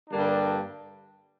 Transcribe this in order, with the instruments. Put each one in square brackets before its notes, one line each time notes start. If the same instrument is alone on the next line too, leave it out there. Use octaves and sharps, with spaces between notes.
[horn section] G2 D3 G3 A#3 D4